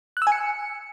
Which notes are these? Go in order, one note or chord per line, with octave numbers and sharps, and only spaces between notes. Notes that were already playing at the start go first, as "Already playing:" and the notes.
F#6
E6
G#5
C#7